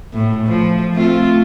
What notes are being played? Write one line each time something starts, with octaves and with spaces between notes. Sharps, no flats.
A2
F3
A3 C4 F4